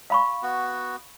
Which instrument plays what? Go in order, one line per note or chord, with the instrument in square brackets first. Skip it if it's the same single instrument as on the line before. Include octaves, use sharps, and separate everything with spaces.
[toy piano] F5 B5 C#6
[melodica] B3 F#4